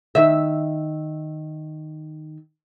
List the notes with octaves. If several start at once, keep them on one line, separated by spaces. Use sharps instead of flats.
D#3 E5